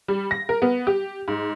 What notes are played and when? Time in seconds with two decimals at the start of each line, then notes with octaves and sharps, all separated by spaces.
0.08 G3
0.31 A#6
0.49 A#4
0.62 B3
0.87 G4
1.28 G#2